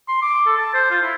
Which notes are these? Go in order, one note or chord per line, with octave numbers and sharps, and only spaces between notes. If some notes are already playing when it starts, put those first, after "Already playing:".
C6
D6
A4
A5
C5
F4
E4